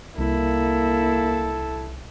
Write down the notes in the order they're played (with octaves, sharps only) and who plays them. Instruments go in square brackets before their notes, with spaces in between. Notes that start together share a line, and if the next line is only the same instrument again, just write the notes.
[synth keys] C2 [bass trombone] A#3 [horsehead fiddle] E4 [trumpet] A4